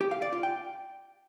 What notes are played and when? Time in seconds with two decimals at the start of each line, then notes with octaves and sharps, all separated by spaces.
0.01 G4
0.11 F5
0.22 D5
0.33 F4
0.43 G5